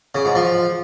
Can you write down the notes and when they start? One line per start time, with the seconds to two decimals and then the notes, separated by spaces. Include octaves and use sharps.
0.15 C#3
0.25 G#2
0.35 F3